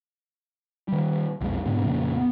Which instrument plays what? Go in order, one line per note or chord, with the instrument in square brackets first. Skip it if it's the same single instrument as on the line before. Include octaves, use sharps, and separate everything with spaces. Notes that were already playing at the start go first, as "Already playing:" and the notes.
[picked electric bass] D#3 G3
B1 F2 G#3
G#2 B2 D3
F1 F2 A#2 C#3
B3